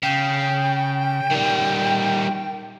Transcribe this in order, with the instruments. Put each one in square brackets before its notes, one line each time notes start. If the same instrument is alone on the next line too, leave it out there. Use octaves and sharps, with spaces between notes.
[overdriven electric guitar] C#3 [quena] G5
[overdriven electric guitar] D#3 G3